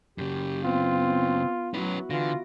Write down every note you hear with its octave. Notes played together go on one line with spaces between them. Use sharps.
F#2 C#3 G4
B3 C4 F4
F#3 C#4 E4 F#4 B4
D3 E3 F4 A#6 D7